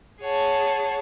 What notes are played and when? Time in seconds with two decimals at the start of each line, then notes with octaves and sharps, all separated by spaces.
0.22 G#4 C#5 F#5 A5